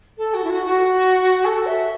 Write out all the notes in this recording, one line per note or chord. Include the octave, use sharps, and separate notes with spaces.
A4
F#4
E4
F#4
F#4
A4
E5